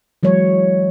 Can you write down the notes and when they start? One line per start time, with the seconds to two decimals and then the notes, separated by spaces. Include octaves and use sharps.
0.23 E3 F#3 G#3 C#5